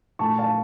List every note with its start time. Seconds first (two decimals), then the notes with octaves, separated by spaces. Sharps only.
0.19 A#2 A3 A5 C#6
0.38 F5 A5